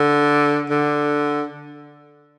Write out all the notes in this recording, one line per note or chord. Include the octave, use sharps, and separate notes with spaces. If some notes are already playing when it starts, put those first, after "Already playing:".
Already playing: D3
D3